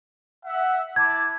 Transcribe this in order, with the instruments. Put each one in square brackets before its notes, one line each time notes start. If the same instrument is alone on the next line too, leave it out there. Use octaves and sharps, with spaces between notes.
[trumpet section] E5 F#5
[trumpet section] E4 A5 D6 [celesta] G#6